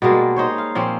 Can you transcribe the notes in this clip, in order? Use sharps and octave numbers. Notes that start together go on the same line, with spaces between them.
B2 G3 G#3 A#3
D#4 C5 C#5
F5
A#2 F3 C4 C#4